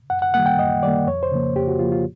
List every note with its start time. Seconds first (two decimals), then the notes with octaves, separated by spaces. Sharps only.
0.10 F#2 F#5
0.22 F#5
0.34 D#3 G3 A#3 F#5
0.46 G5
0.59 F#2 D#5
0.83 D#3 G3 A#3 D5
1.07 F2 C#5
1.23 C5
1.32 C#3 F3 A#3
1.55 F2 G4
1.68 F#4
1.79 C#3 F3 A#3 F4
1.92 F4